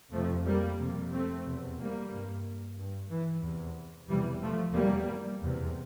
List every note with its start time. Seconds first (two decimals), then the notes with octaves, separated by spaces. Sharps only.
0.12 F2 C3 F3 A3
0.45 G3 A#3
0.78 F2 C3
1.11 A3 C4
1.45 E2 C3
1.77 G3 A#3
2.10 G2
2.77 G2
3.10 E3
3.42 E2 C3
4.08 E2 C3 E3 G3
4.41 F3 A3
4.74 E2 C3 G3 A#3
5.41 E2 C3